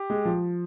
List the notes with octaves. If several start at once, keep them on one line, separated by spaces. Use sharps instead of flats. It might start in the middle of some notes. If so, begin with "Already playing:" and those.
Already playing: G4
G#3
F3